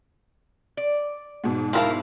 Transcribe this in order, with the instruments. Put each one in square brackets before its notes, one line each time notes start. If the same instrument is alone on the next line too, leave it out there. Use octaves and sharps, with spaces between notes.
[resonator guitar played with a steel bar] D5
[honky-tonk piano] G#2 B2
[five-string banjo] F3 A#4 A5 [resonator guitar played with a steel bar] E4 F5